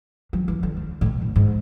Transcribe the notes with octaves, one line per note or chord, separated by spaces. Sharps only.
F#3
E3
D3
C#3
A2
B2
A2
G#2